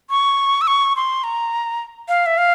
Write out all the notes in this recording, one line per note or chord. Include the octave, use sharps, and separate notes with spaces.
C#6
E6
C#6
C6
A#5
F5
E5
F5